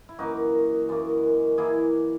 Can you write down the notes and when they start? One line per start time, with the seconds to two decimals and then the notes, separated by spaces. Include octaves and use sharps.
0.09 E4
0.18 F#2 E3 A#3 D#4 F#4
0.89 F#2 E3 A#3
1.58 E3 A#3 E4 G#4